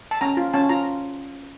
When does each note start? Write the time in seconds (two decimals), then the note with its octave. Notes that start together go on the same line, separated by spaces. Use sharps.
0.11 A5
0.21 C#4 A#5
0.37 F4
0.54 C#4 A5
0.69 F4 A#5